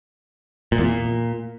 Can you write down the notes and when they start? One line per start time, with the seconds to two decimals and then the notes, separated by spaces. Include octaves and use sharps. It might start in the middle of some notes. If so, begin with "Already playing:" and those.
0.72 A#2
0.78 E2
0.85 A#2